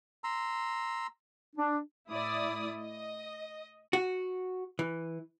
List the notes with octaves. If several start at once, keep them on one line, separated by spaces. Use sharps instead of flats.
A#5 C6 E6
D4
A2 E4 D5 D#6
D#5
F#4
E3